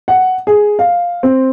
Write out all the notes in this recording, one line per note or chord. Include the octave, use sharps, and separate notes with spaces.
F#5
G#4
F5
C4